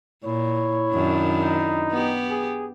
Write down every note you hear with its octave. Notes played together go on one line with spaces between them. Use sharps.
A#2 E4 C#5
F#2 D#3 D4
D#4
B3 G4
G#4